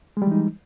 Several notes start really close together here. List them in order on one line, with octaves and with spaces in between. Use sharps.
G#3 G3 E3 D#4